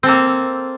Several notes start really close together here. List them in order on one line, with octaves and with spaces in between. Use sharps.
C4 A4 A#3